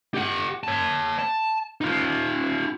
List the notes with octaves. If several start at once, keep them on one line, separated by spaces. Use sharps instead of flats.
G4 F#5
C#5 A5
A5
D#4 F4